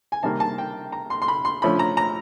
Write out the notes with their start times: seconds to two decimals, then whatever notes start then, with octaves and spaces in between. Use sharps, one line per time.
0.12 G#5
0.23 C3 D#3 G3 A#3 A5
0.40 A5
0.58 G5
0.92 A#5
1.10 C6
1.22 C6
1.28 B5
1.45 C6
1.62 D3 F3 A3 C#4 B5
1.79 A#5
1.97 A#5